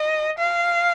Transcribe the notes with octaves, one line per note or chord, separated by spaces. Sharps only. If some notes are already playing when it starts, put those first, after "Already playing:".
Already playing: D#5
F5